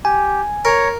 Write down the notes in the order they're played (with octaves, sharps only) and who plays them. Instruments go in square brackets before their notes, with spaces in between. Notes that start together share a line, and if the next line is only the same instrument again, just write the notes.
[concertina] G4 [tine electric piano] G#5
[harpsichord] A#4 [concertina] C#5 A#5